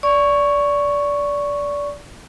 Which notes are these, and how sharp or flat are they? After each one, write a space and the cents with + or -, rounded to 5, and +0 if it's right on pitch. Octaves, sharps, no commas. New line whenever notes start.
D5 -20 C#6 +0